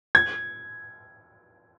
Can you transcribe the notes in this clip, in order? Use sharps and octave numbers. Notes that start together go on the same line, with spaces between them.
G#6